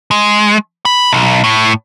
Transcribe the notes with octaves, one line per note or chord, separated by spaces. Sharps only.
G#3
B5
B1
A2